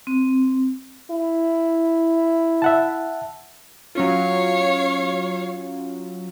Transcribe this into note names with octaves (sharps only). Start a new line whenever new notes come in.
C4
E4
E5 F#5 A5
F#3 C#4 F4 C#5 F5